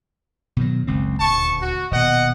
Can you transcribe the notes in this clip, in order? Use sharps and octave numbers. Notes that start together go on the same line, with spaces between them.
B2 D#3 F#3
F#1 C#2 C4
D#1 D2 A5 C#6
F#4
D#1 B2 D#5 F#5